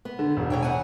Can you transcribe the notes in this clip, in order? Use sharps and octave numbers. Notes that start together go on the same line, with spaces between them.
B3
D3
E1
B2 C#5 G5
F#5 G#5